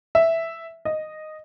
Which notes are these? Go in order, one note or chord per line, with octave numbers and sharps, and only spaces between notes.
E5
D#5